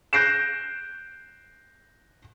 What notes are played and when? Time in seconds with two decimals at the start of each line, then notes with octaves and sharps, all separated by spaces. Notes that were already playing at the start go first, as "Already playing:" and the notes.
0.13 F#6 G6 A#6 C7 D7 E7